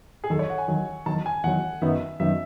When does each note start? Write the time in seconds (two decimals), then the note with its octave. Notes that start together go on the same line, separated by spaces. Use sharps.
0.24 G#4
0.30 E2 D#3 F#3 A4
0.39 C#5
0.50 F#5
0.58 G#5
0.68 E2 D#3 F#3
1.06 E2 D#3 F#3 A5
1.26 G#5
1.44 E2 D#3 F#3 F#5
1.82 F#2 D#3 F#3 B3 D#4 E5
2.20 F#2 D#3 F#3 B3 D#4 E5